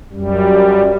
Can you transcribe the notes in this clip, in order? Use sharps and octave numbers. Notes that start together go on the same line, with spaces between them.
F#2 G3